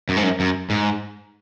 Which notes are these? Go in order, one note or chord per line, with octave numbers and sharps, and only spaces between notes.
F#2
G#2
F#2
F#2
G#2